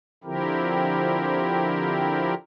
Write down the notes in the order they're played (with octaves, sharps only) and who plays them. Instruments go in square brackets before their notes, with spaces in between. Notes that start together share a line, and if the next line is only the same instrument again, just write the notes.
[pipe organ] D3 F3 C4 E4 G4 A#4